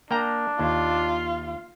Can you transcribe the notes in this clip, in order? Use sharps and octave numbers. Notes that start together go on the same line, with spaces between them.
A#3 D4 G5 A#5
D#2 F4